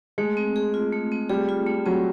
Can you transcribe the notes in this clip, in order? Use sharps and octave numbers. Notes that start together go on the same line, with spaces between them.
G#3 A3
C4
G#4
F4
A3
C4
G3 G#4
F4
A3
F#3 C4